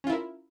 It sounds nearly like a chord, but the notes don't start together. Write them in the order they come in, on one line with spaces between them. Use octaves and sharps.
C#4 F4 E4 A#4